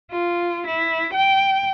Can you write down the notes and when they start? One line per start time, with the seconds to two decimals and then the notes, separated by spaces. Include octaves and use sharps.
0.11 F4
0.67 E4
1.14 G5